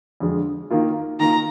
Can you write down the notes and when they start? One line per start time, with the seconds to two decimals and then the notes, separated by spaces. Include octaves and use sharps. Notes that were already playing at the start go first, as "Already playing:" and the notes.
0.20 F2 D3 G#3
0.70 D#3 A#3 F4
1.19 D#3 A#3 F4 A#5